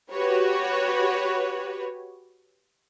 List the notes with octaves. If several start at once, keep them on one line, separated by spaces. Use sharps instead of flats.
F#4 G4 B4 C#5